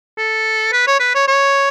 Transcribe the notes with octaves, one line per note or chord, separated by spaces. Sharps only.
A4
B4
C#5
B4
C#5
C#5